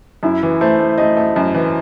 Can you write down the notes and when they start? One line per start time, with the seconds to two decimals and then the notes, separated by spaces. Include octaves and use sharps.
0.23 F#2 E4
0.43 E3
0.61 A3 C5
0.79 A3
0.98 A3 D#5
1.17 A3
1.36 F#2
1.54 E3